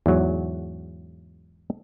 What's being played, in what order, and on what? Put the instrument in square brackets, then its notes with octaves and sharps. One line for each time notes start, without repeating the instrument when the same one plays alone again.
[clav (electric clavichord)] E2 G#2 F#3